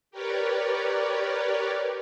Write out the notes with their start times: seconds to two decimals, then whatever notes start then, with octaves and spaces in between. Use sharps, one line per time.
0.11 G4 A#4 B4 C#5 D5